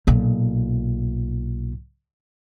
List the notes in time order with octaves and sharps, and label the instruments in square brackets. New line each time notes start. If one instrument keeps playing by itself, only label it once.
[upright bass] B1 A#2